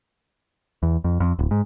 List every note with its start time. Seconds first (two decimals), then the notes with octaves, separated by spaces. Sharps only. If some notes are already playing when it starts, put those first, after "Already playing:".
0.83 E2
1.04 F2
1.20 F2
1.39 D1
1.51 G#2